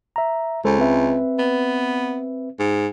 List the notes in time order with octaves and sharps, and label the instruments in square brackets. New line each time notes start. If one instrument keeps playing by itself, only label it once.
[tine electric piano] E5 A#5
[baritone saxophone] C#2 [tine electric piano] G#3 A4 C5
[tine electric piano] C4 B4 E5
[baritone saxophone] B3
G#2